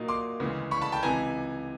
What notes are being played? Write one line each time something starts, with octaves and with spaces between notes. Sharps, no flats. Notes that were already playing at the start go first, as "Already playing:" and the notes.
Already playing: A#2 F#3 A#3 D#4
C6 D6
D2 C#3 E3 G#3 B3
B5 C#6
A5 B5
G5 A5
C#2 C3 E3 G#5 A#5